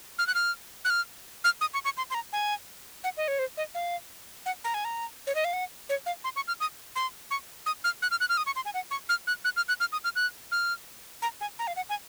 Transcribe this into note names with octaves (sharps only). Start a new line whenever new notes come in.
F6
F#6
F6
F#6
F6
F6
D#6
C#6
C#6
C6
C6
A#5
G#5
F#5
D#5
C#5
C5
D#5
F5
F#5
A#5
G#5
A#5
C#5
D#5
F5
F#5
C#5
F5
C6
C#6
F6
D#6
C6
C#6
D#6
F6
F#6
F6
F#6
F6
D#6
C#6
C6
G#5
F#5
C#6
F6
F#6
F#6
F6
F#6
F6
D#6
F6
F#6
F6
A#5
G#5
A#5
F5
F#5
G#5